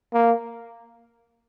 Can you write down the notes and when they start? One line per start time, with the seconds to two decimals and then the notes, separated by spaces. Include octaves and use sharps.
0.13 A#3